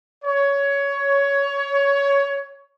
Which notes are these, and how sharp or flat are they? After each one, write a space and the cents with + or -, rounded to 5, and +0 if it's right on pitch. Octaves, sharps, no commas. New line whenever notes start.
C#5 +15